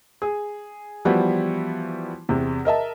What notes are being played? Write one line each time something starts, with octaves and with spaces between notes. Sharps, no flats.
G#4
E3 F3 G3 B3 E4 F#4
E2 C3
A#4 D#5 E5 A5